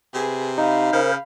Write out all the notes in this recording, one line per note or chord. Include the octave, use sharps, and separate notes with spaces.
C3 G#4 B4
D#4 F5 B5
C#3 A#4 C5